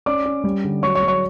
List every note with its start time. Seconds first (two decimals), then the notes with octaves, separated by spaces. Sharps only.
0.06 C#4 D5 D6
0.25 C#4
0.44 G3
0.64 D3
0.83 F#3 C#5 C#6
0.95 C#5 C#6
1.02 F#3
1.08 C#5 C#6